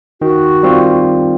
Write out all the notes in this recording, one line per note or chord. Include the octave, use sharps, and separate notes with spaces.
D#3 F#4
G3 C4 F4